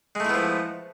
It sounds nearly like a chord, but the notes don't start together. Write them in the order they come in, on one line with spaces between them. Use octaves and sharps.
G#3 A3 E4 B3 F3